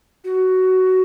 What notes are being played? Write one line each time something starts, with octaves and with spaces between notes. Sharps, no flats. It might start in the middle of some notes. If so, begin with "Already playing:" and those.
F#4